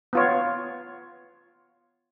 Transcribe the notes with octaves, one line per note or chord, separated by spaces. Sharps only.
B3 F4 C#5